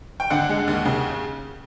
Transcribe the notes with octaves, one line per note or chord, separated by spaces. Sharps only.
G5
D3 F#5
G#3
D#2
C#3